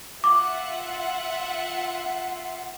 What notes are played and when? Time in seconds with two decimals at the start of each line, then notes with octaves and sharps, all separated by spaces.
0.24 F4 E5 F#5 D6